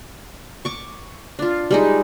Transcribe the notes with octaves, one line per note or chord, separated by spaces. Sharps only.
C#6 D6
D4 F4
G3 G#3 D#4